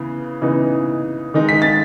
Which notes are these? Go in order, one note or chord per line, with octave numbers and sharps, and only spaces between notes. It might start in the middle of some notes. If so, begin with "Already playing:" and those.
Already playing: C#3 E3 B3
C#3 E3 B3 D#4
D#3 G#3 D#4
B6
A6